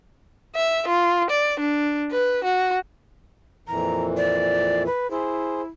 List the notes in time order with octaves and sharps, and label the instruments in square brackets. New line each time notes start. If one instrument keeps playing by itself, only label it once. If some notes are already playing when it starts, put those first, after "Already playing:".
[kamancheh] E5
F4
D5
D4
B4
F#4
[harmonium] F2 A#2 E3 [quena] A#5
[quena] D5
B4
[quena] E4 [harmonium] G#4 C5